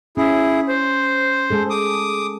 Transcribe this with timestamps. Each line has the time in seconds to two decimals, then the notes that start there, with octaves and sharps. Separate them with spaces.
0.17 C#4 E4 G#4
0.68 C5
1.51 G#3 G#4 A4
1.70 D6 D#6